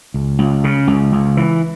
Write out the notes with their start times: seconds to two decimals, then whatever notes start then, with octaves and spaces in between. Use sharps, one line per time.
0.14 C#2
0.39 C#2
0.64 C#3
0.87 C#2
1.12 C#2
1.37 E3